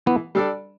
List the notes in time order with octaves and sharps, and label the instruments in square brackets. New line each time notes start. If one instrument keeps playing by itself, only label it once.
[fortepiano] E3 [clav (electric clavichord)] B3
[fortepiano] G3 D4 A4 D5